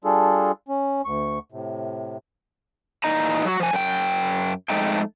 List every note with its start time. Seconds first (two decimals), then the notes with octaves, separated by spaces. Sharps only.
0.04 G3 D4 F4 G#4 A4
0.68 C#4
1.05 D2 C#6
1.52 A2 C3
3.04 A#2 E3 D#4 D#5 A#5
3.45 F#3 F#4
3.60 F3 G#5
3.73 F#2 G5
4.70 F2 G#3 A3 D#4 G5